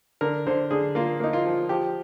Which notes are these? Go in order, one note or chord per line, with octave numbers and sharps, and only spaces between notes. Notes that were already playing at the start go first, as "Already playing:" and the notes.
D3 A#4
D3 C5
D3 G#4
A#3 F4
A#3 D#4
F4
F3
F3 G4